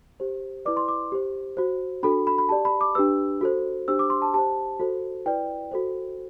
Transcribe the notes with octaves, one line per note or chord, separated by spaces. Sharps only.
G4 C5
E4 B4 D5 D6
C6
D6
G4 C5
F#4 C5
D4 F#4 A4 B5
B5
B5
G4 D5 A5
B5
D6
D4 G4 B4 E6
F#4 A4 C5
D4 G4 C5 E6
D6
C6
A5
G4 C5 A5
F#4 A4 C5
E4 B4 D5 G5
F#4 A4 C5